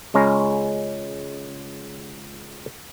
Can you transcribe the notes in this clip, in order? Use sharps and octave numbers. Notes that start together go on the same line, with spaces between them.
C#2 G#3 C#4 A#5